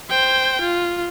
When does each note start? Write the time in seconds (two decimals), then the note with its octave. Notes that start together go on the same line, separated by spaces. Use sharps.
0.10 C5 G5
0.61 F4